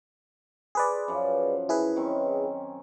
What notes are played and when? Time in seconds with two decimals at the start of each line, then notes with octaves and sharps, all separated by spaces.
0.75 G#4 B4 C5 D5
1.08 F#2 F3
1.69 E4 G#4 B4
1.96 D#3 C4 C#4